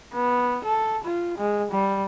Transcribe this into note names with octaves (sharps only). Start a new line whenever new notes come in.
B3
A4
F4
G#3
G3